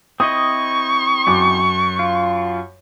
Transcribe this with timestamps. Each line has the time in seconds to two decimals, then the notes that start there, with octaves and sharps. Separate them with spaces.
0.20 C4 E4 D#5 C#6 D#6
1.27 F#2 D6
1.99 F4